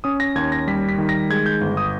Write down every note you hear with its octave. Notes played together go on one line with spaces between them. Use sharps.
C#4 D#6
A#6
D#2 G#6
A#6
G3 B6
B6
D#3
A#6
G#3 G#6
G6
G1
D#6